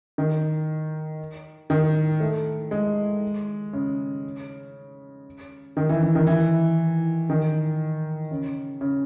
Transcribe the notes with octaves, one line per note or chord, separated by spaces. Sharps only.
D#3
D#3
A3
G#3
C#3
D#3
E3
E3
D#3
E3
D#3
C#3
C#3